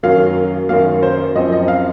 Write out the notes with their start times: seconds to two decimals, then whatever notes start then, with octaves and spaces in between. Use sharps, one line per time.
0.03 F#2 D#3 F#3 A#3 F5
0.69 F#2 D#3 F#3 A#3 F5
1.03 C5
1.36 F#2 F3 C4 D#5
1.52 D#5
1.68 F5